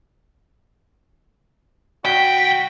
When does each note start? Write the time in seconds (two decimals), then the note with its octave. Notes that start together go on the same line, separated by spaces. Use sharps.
2.05 C2 F#4 G5 B6